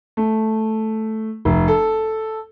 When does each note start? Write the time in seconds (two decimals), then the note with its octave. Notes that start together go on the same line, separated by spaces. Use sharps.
0.17 A3
1.45 F1
1.68 A4